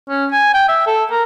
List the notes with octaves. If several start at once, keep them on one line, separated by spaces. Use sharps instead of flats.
C#4
G#5
G5
E5
A4
A#4